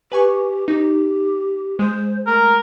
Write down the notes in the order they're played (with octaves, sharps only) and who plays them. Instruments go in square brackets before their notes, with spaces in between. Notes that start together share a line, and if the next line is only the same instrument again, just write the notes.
[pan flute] G4 [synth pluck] B4 G#5 C#6
[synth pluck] D#4 [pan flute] G4
[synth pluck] G#3 G#4 [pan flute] C5
[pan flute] A3 [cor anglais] A#4